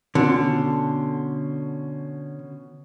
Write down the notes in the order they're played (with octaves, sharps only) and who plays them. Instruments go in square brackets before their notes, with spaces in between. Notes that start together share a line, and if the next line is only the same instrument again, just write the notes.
[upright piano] B2 C#4 C6 [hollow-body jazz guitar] D3